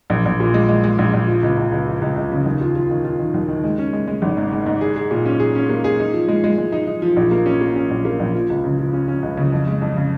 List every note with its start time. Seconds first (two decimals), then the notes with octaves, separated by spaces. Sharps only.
0.10 A#1
0.25 A#1
0.40 A#2
0.54 G#3
0.69 G#3
0.84 G#3
0.99 A#1
1.13 A#1
1.28 F3
1.43 C#2
1.58 C#2
1.72 C#2
1.87 F3
2.02 C#2
2.16 C#2
2.32 C#3
2.46 D#2
2.61 F4
2.75 F4
2.90 D#3
3.05 F4
3.19 D#3
3.34 D#2
3.48 D#3
3.64 G#3
3.78 C#4
3.93 G#3
4.07 G#3
4.22 G#1
4.37 G#2
4.52 G#3
4.66 G#2
4.81 G#4
4.96 G#4
5.11 A#2
5.25 C#4
5.40 G#4
5.55 C#4
5.70 A#3
5.84 G#4
5.99 D#4
6.13 F3
6.28 G#3
6.44 G#3
6.58 G#3
6.72 D#4
6.87 D#4
7.02 F3
7.17 A#1
7.31 A#3
7.46 C#4
7.61 A#3
7.76 C#4
7.91 A#1
8.05 A#3
8.20 A#1
8.35 F3
8.50 C#2
8.64 C#3
8.79 F3
8.93 C#4
9.08 C#4
9.23 C#2
9.37 C#3
9.52 F2
9.67 G#3
9.82 F2
9.96 C#3